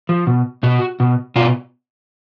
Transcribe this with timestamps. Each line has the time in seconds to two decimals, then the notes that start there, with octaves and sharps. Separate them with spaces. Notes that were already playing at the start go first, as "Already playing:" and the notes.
0.09 F3
0.27 B2
0.63 B2 F#4
1.00 B2
1.36 B2 F4